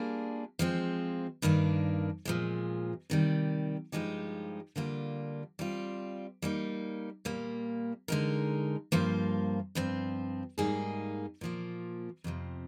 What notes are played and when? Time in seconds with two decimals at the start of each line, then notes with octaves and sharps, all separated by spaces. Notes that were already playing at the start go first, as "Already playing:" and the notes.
Already playing: G3 A#3 D4 F4 G#4
0.59 F3 G#3 C4
1.42 G2 D#3 A#3 D4
2.25 A#2 F3 G#3
3.10 C3 D#3 G3
3.92 G2 F3 G#3 D#4 G4
4.76 D3 G3 A#3 F4
5.59 G3 C4 F4
6.42 G3 A#3 D#4
7.25 A#2 G3 A#3
8.08 D3 G#3 D#4 A#4
8.92 G2 F3 A#3 F4 C5
9.75 G2 F3 C4
10.58 G#2 G3 A#3 D#4 G#4
11.41 A#2 F3 A#3
12.24 F2 C3 F3